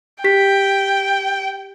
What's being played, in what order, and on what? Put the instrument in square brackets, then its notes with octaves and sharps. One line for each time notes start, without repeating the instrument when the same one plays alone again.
[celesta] G4 B6 [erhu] G5